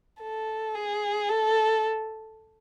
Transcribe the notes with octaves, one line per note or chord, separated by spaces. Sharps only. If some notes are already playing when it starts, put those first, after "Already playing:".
A4
G#4
A4